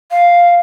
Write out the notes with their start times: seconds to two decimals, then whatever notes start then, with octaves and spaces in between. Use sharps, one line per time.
0.11 F5